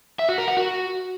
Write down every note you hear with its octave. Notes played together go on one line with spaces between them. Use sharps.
E5
F#4
A#4
F#5
F#4